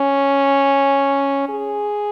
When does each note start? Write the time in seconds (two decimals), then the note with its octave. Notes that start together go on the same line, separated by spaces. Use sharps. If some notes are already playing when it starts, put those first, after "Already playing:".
Already playing: C#4
1.49 G#4